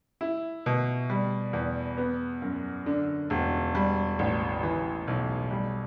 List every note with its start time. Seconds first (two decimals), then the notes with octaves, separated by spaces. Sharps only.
0.21 E4
0.66 B2
1.10 G3
1.53 E2
1.98 B3
2.42 F#2
2.86 D3
3.30 E1
3.75 G3
4.19 A1
4.63 E3
5.07 B1
5.51 G3